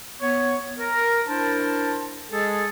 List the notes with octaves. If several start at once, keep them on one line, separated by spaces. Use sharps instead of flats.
B3 C#5
A#4
D4 E4 A#4 C5 A5
G#3 G#4 A4